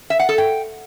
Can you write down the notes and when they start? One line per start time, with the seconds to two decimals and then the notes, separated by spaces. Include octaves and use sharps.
0.10 E5
0.19 F#5
0.29 A4
0.38 G5